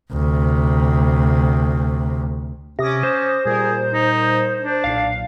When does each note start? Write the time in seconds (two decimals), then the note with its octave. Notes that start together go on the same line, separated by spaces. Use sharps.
0.12 D2 C3
2.79 C3 C#4 D6 D#6 A#6
3.03 C5
3.45 A#2 G3 G#4 A#4
3.94 D#4
4.62 D4
4.84 B1 A#2 F5